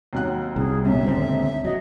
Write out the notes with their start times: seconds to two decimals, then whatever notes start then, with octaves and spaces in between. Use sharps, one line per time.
0.13 D#2 F#3 F#6
0.56 C2 G#4
0.85 D#1 B1 F#2 E5
1.06 C#2 D3 C4
1.65 F#3 D#5